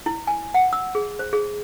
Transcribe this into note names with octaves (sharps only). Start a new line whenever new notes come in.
E4
G#5
F#5
E6
G#4
C5
G#4